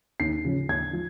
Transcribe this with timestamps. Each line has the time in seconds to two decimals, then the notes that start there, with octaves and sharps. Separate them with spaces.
0.20 D#2 C7
0.45 C#3 F3
0.69 D#2 G#6
0.93 F3